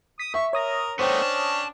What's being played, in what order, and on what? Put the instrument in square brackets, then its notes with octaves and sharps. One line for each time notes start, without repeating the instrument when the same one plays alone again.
[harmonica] D#6 [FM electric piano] B6
[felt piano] E5 [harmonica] C#6
[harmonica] A#4 [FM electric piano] C#5 D#6 A#6
[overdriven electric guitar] A3 B3 [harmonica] C#4 D4 [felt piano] C5 G5
[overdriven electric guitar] A5